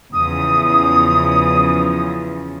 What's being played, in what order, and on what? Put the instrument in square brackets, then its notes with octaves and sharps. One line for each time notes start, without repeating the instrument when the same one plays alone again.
[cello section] E2 C#3 F3 [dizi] D#6